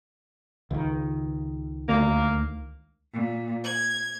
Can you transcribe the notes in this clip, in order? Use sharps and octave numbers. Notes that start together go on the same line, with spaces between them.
C#2 D#3
D2 A#3
A#2
G#6